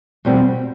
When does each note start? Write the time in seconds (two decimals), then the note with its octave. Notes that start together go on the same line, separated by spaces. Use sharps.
0.25 E2 B2 G3 C4